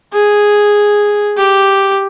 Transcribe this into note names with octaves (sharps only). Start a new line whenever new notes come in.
G#4
G4